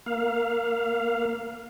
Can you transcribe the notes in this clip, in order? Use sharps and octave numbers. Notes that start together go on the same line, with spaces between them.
A#3 F5